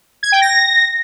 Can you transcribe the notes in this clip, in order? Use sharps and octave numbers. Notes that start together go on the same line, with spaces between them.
G#6
G5
A#6